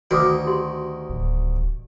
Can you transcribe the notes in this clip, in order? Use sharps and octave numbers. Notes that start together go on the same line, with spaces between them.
D2 D#3 F#4 B4 D6
G4 C6
D1